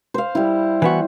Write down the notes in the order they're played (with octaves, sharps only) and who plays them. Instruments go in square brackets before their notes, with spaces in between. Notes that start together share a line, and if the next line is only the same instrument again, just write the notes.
[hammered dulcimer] C5 F5
G3 E4
[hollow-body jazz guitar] E3 B3 F#4